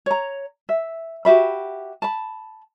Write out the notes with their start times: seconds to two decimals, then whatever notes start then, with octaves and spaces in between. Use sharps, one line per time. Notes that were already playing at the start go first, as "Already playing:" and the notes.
0.06 C#5 A#5
0.69 E5
1.25 F#4 G4 E5 B5
2.02 A5 B5